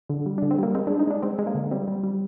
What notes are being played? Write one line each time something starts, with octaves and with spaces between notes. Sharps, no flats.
D3
G3
D3 D4
C4
G3 A#3
G#3 C4
G#3 D4
D#4
G#3 D4
G#3 C4
G#3
A#3
D3
G3 C4
G3
G3